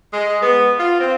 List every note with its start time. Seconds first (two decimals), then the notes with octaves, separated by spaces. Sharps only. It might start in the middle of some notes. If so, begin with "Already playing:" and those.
0.13 G#3
0.41 B3
0.77 F4
0.99 C4